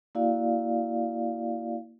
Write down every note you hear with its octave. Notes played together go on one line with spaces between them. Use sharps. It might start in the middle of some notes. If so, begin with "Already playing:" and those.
A#3 E4 F#4 D5 F5